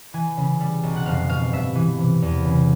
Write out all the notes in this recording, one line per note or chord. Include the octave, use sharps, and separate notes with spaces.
E3 G#5
C#3
G3
B1
F#5
F1 F5
B2 F5
G2 E5
E3
C3
E2
C#3